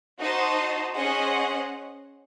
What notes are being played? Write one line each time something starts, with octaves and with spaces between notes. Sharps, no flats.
D#4 F#4 C5 D#5 A5
C#4 G#4 C5 D#5 F#5